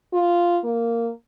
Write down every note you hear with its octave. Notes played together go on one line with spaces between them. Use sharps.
F4
A#3